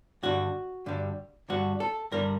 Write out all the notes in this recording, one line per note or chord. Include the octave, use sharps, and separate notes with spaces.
G2 D3 G3 F#4
G2 D3 G3
G2 D3 G3 F#4
A4
G2 D3 G3 A#4